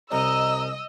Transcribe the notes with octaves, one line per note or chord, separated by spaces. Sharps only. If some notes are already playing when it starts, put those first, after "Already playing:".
C2 D#5 A#5 E6